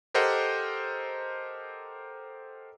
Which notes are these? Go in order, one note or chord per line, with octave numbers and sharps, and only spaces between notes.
G4 A4 A#4 C5 D#5 F#5